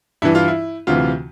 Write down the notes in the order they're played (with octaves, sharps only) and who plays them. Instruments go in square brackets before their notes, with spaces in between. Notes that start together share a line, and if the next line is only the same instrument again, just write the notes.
[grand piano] G2 E3 E4
F4
E4
D2 C3 E3 F4